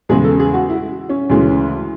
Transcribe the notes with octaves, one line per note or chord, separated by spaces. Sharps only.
E2 C#3 G#3 G#4
A4
G#4
F#4
E4
C#4
D2 C#3 E3 G#3